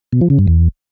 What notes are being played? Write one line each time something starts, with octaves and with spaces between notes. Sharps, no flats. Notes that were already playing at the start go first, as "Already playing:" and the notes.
B2
F3
C#3
G2
E2